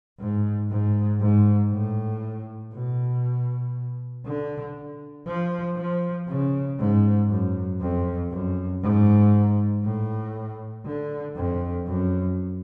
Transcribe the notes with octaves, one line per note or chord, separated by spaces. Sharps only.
G#2
G#2
G#2
A2
B2
D3
F3
F3
C#3
G#2
F#2
F2
F#2
G#2
A2
D3
F2
F#2